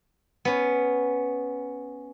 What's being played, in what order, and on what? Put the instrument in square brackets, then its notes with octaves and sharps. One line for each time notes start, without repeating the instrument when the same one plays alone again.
[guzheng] B3 C#4